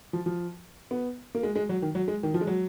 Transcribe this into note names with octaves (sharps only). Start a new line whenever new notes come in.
F3
F3
B3
A#3
G#3
G#3
F#3
D#3
F#3
G#3
D#3
F3
G#3
F#3